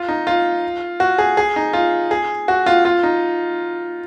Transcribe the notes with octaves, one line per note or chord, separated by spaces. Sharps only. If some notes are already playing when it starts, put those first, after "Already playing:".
Already playing: F4
D#4
F4
F#4
G#4
G#4
D#4
F4
G#4
F#4
F4
F4
D#4